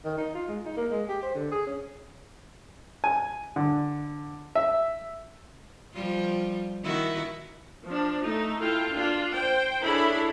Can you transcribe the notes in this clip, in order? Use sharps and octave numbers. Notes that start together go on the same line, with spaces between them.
D#3
D#4
F4
G#3
D#4
A#3
G#3
G4
C5
D3
G#4
C#4
G#5
D3
E5
F3 G3 F4
D#3 E4 F#4
F3 D4
A3 D#4
E4 F4 A4 F5 G5
D4 F4
C5 G5
D4 E4 G#4 A4 C#5 B5